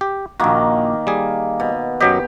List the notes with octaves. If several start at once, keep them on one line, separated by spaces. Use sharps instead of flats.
G4
A#1 D#3 A#3 F#4
G3 G#4
B2
F#2 F#3 G4 D#5